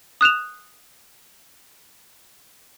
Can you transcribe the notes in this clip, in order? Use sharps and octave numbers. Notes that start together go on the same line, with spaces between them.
D#6 F#6 E7 F7